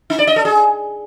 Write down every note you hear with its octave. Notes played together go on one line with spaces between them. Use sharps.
D#4
D5
D#5
A4
G#4